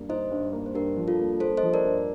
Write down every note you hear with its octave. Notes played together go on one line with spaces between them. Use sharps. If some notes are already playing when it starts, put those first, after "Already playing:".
Already playing: G2 A#3
D#4 C5 D#5
G2
A#3
C5
G2 G4 A#4
F3
F4 A4
A#3
A#3 A4 C5
C5 D#5
F3
A#4 D5
G2